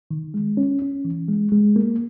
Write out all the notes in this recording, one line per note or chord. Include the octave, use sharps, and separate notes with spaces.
D#3
G#3
C#4
C#4
E3
G#3
G#3
A#3